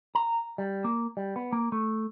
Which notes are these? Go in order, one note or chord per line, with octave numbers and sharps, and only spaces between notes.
A#5
G3
A#3
G3
B3
A#3
A3